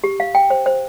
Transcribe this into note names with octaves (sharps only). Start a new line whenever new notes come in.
G4
F5
G5
C5
C5